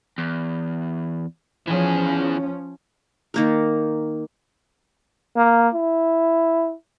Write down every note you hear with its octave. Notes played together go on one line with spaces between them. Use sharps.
E2
E3 F3 C#4 G#4
D#3 A#3 A#4
A#3
E4